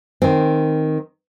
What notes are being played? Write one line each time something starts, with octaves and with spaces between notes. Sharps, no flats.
D#3 C4